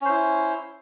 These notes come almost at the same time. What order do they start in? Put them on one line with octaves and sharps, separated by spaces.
C#4 C5 E4